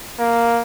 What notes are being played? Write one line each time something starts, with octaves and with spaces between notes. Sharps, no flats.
A#3